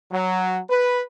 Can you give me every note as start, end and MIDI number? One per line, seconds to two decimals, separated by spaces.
0.12 0.60 54
0.70 1.02 71